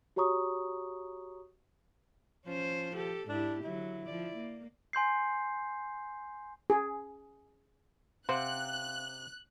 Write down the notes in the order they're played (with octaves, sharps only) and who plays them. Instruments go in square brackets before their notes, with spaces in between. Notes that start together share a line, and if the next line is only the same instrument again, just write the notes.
[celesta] F#4 G4 C#5 A#5 C#6 D#6
[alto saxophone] F3 [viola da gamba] C#4 C5
[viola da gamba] G4 A4
[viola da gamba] G#2 E4 G4 [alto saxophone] D4
[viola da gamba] D3 F#3 [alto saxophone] E4
[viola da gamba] F3 D5
A#3
[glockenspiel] G#5 C6 G6 C7
[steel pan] G#4
[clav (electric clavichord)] C3 C4 F#5 [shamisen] C5 [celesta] F5 [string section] F#6